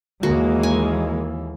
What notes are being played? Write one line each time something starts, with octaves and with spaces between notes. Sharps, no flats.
D#2 E3 G#3 A#3 F#4
G#5